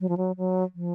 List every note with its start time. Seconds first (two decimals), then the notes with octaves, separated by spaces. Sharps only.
0.01 F#3
0.09 F3
0.17 F#3
0.38 F#3
0.75 F3